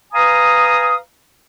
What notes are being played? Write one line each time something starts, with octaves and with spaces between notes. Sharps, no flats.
B4 F5 G#5 A#5 D#6